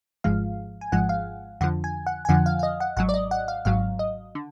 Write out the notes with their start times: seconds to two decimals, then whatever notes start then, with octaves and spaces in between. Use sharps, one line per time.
0.24 G#1 G#2 F3 G#3 F5
0.81 G#5
0.92 G#1 G#2 F3 G#3 F#5
1.09 F5
1.61 F2 D3 F3 F#5
1.84 G#5
2.07 F#5
2.25 G#5
2.29 F2 D3 F3 F#5
2.46 F5
2.59 F5
2.63 D#5
2.80 F#5
2.97 G#1 G#2 F#3 F#5
3.09 D5
3.14 D#5
3.31 F#5
3.48 F5
3.65 G#1 G#2 F#3 F5
3.99 D#5
4.35 D3